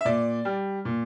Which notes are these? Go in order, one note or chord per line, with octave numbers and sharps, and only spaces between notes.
E5
A#2 D5
G3
A#2